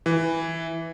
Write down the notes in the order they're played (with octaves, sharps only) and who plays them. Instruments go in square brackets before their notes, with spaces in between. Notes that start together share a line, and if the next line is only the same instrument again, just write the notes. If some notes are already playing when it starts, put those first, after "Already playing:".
[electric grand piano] E3